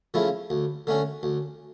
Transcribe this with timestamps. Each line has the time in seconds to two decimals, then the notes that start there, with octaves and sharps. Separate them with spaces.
0.14 C#3 F3 A3 E4
0.50 D2
0.87 D3 A3 C#4
1.23 D2